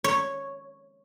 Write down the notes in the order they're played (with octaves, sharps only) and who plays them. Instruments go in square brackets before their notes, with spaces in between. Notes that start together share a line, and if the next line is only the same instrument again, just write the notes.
[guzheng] C#5